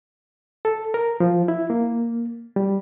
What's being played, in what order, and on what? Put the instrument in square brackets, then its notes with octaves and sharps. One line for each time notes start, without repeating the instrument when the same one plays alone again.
[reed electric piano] A4
A#4
F3
E4
A#3
G3